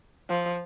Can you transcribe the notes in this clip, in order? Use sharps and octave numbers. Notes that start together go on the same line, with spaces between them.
F3